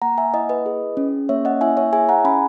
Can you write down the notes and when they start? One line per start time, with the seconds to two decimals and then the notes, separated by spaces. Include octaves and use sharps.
0.02 A#3 F#5 A#5
0.18 E5 G#5
0.34 E4 D#5 F#5
0.49 B4 D#5
0.66 G#4
0.97 C#4
1.29 A#3 C#5 E5
1.45 D#5 F#5
1.61 E4 E5 G#5
1.77 C#5 E5
1.93 G#4 E5 G#5
2.09 F#5 A#5
2.25 C#4 G#5 B5